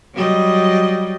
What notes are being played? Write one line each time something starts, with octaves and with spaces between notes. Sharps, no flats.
F#3 G3 D#5